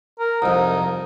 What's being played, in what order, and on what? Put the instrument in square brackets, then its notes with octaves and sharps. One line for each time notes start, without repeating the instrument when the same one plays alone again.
[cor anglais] A#4
[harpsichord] C2 F2 [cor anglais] D#4